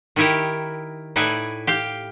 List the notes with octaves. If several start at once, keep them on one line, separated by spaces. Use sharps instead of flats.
D#3 D#4 E4 G4 A#4
A2 D#4 E4 B4 D5 G#5
G4 F5 G5